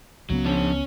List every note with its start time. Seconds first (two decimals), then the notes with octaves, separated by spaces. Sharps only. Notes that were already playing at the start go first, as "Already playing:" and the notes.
0.30 C#2 C#3 F#3 B3
0.45 F3 C#4 D4 A5